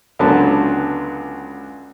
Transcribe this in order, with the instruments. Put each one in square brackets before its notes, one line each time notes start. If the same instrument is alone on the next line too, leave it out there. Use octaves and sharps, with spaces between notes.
[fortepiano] C#2 D3 F#3 B3 A5